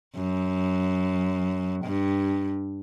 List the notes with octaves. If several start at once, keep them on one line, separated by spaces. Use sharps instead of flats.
F#2
G2